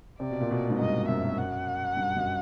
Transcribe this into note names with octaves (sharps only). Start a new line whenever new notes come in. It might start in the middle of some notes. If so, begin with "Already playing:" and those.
C3 D5
B2
A#2
B2
G#2
G2 D#5
F#2 E5
F#5
G2
F#2